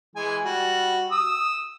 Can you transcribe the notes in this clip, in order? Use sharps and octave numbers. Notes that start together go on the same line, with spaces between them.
E3 G#3 G#5
G3 F#4
D#6 E6